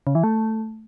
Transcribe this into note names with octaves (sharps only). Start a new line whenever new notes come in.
C#3
E3
A3